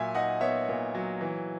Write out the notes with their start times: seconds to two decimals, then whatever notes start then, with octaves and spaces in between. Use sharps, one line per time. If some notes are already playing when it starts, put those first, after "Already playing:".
Already playing: A#2 F#3 E5 G#5
0.14 D#4 D#5 F#5
0.41 B3 C#5 E5
0.68 A#2
0.95 F#3
1.21 E3